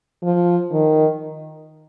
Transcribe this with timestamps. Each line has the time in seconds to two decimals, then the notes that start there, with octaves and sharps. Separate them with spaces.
0.23 F3
0.72 D#3